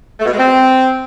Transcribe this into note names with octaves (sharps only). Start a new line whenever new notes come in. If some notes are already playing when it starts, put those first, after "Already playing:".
A3
B2
G#3
C4